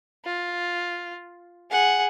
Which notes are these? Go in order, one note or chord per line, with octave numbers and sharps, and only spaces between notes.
F4
G#4 F#5